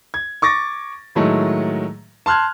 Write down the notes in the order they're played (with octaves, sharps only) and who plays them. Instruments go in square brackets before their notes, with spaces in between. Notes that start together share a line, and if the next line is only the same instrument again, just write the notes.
[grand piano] G#6
C#6 D6 A6 A#6
A2 D#3 F#3 G#3 A3
A5 C6 F6 F#6 G#6